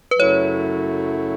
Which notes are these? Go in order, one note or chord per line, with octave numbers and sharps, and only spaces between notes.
B4
F#2 C#3 F#3 A3 E4 C#5